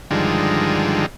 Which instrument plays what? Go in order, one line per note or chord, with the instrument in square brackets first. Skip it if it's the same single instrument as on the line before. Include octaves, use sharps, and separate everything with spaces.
[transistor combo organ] G2 D3 D#3 F3 G#3